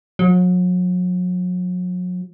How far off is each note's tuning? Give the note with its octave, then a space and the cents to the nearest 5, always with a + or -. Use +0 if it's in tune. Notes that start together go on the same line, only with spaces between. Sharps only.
F#3 -40